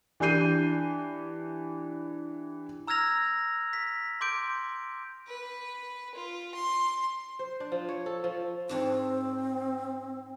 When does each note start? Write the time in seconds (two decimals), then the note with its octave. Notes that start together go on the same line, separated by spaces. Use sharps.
0.20 E3 D4 G4 G6 C7 D#7
2.87 A#5 E6 F6 G#6 A#6 F7
3.73 B6
4.21 C6 D6 G6 D7
5.27 B4
6.14 F4
6.54 C6
7.39 C5
7.60 D4
7.72 F3
7.89 C#5
8.06 A4
8.24 F3
8.69 G#2 C4 D4 C#5